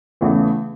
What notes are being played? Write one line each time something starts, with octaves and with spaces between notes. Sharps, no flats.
E2 C#3 E3 A3